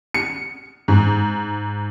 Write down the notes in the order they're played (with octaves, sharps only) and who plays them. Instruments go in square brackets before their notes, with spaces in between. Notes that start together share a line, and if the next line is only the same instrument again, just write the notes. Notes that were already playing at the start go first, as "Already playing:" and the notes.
[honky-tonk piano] C#7
G#2